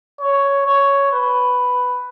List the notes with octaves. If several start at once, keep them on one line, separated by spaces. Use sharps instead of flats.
C#5
C#5
B4